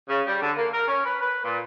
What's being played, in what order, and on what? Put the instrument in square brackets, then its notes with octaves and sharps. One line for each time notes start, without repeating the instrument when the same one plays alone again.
[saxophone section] C#3
G3
D3
A#3
A#4
C#4
B4
B4
A#2